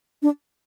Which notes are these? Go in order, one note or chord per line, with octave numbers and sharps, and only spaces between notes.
D4